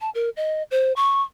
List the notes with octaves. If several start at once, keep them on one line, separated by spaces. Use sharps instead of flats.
A5
A#4
D#5
C5
C#6